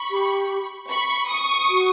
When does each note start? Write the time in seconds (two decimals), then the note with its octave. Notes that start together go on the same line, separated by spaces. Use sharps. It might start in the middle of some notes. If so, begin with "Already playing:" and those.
Already playing: B5 C#6
0.11 G4
0.90 B5 C#6
1.29 C#6 D#6
1.69 F#4